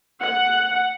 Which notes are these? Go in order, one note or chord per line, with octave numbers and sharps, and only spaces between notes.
F#5